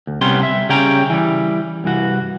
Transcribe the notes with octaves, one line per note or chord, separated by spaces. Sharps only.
D2
C2 C3 G3 B3 C#4 C6
E5
C#3 G3 C#4 G4 G5 A#5
E3 G3
C2 G2 E3 F#4